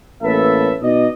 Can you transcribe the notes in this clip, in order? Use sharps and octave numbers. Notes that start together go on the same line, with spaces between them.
A1 A#3 A4 B4 E5
B2 D#4 D5 D#5